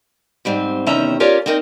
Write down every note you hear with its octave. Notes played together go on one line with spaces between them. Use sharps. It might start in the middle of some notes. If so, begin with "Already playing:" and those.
G#2 G3 C4
E2 C3 D#3 C#4 E5 A#5
C#4 F4 G4 A#4 C#5 D5
C4 D4 D#4 A#4 D#5